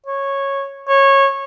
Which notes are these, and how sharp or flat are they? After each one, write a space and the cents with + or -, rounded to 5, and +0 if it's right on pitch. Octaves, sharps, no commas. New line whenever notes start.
C#5 -10
C#5 -15